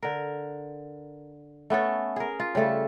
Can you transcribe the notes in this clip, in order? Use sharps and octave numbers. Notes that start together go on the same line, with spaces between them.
D3 A#4
A3 B3 C#4 A4
G#4 A#4
F4
C#3 G3 A3 A4